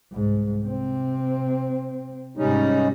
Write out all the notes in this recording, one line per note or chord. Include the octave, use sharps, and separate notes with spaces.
C2 G#2
C3 C4
G#2 C3 G3 C#4 D#4